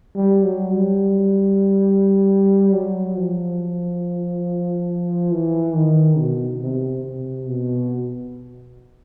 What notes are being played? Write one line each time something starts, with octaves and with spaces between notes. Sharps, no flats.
G3
F#3
G3
F#3
F3
E3
D#3
B2
C3
C3
B2